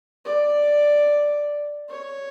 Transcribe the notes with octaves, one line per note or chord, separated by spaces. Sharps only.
D5
C#5